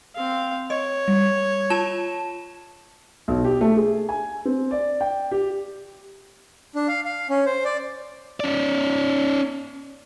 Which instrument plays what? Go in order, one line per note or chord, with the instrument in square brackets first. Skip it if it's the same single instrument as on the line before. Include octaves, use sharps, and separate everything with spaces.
[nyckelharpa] C4 F5
[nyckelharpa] C#5 [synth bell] D#5
[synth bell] G3
F4 A5 E7
[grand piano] B1
G4
A3
G#4
G#5
C4
D5
G5
G4
[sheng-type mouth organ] D4
F5
F5
C#4
C5
D5
[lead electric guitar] C#4 D5